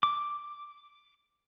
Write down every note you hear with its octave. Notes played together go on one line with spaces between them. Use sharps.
D6